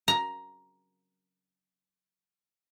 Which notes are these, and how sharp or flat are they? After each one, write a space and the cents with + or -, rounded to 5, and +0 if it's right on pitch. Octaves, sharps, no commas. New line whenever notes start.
A#5 +10